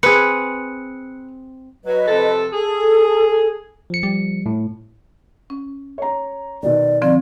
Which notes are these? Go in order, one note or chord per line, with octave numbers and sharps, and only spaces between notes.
C4 G#4 B4 F#6 C#7
F#3 B4 D#5
C3 F3 A4
G#4 A4
F3 C#7
G3
A2
C#4
C#5 A#5
B2 D#3 D5
D3 F3 C4 D5